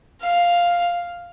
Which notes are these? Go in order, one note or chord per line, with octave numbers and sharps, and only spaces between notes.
F5